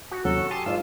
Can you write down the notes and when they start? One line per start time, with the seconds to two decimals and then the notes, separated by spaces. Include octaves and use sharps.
0.11 F#4
0.25 D#2 C3 F#3 C#4 A4
0.51 G4 G#5 A5 C6 D#6
0.66 G#2 F4 F5 E6